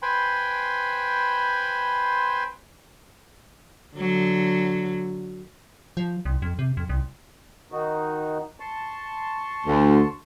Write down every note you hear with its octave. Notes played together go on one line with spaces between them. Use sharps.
B4 C5 G5 G#5 B5 C6
D3 F#3
F3
C2
F2
C3
F2
C2
D#3 D#4 F#4
A5 C6 C#6
D2